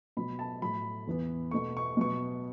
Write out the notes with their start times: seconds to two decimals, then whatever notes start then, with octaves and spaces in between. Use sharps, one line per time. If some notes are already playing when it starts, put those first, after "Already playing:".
0.17 B2 F#3 B3 B5
0.39 A5
0.62 A2 F#3 A3 B5
1.07 E2 E3 B3
1.51 B2 A3 C#6
1.77 C#6
1.97 B2 F#3 B3 C#6